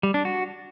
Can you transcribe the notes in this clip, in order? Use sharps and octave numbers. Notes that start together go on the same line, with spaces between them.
G3
D4
F#4